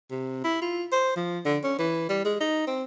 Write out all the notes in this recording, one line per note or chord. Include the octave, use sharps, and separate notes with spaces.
C3
E4
F4
C5
F3
D3
C#4
E3
G3
G#3
D#4
C4